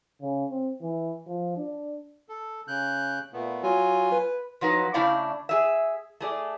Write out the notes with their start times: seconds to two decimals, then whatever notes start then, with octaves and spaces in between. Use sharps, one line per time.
0.21 C#3
0.50 C4
0.81 E3
1.27 F3
1.57 D4
2.29 A4
2.68 C#3 F#6 G6
3.33 A#2 A3 B3
3.63 F#3 F4 G#5
4.12 B4
4.61 F3 F#3 D#4 B4
4.94 C#3 A3 D4 E4 D5 F5
5.49 G#4 E5
6.20 A3 G#4 D5